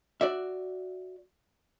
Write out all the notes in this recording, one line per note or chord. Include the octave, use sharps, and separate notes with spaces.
F#4 D5 E5